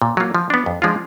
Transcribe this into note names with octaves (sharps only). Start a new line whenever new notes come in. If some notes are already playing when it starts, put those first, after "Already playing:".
A#2
F#3 A#3 F4
F3
B3 D4
F2
F3 G#3 D4 F4